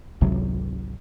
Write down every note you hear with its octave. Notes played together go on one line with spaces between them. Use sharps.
G#1 C#2 C3 F#3